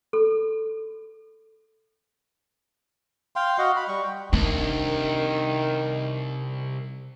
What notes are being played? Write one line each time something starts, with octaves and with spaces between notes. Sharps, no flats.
A4
F5 G5 C6
F#4 D#5 F5 F#5
B5
G3 C#6
G5
C2 D#3 D4